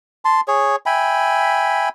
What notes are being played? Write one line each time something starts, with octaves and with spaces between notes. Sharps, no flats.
A5 C6
G#4 C#5
E5 G5 G#5 B5